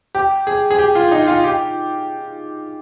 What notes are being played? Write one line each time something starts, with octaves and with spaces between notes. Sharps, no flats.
G4
G#4
G#4
G4
F4
D#4
F4
G4